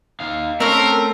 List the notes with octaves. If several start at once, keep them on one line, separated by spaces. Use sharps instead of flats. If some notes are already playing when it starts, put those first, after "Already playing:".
D#4 F5
A3 C4 C#4 A#4